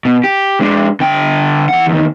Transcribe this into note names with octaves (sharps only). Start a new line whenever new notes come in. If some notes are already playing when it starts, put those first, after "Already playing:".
B2
G4
G#3 D4
D3 G5
E3 F#5
E2 D#3